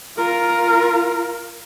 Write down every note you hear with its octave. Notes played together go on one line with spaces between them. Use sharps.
F4 A#4